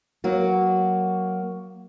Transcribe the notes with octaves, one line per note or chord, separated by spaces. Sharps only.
F#3 A#3 F#4